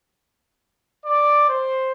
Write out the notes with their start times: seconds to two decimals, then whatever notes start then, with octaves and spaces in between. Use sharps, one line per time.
1.05 D5
1.47 C5